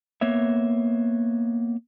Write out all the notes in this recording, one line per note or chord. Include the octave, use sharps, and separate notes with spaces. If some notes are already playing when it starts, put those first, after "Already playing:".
A#3 B3 C#5 E5